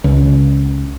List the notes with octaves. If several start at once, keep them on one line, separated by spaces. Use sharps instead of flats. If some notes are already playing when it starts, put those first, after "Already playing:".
C#2